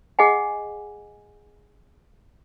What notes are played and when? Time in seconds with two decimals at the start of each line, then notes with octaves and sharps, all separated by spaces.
0.19 G#4 D#5 F#5 G#5